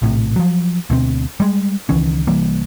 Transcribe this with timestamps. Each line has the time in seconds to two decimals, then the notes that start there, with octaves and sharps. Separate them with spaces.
0.02 A#1 A2 C3
0.36 F3 F#3
0.90 D2 B2 C4
1.40 G3 G#3
1.89 C#2 D#3 E3 C#4
2.27 C2 E3 G3 A#3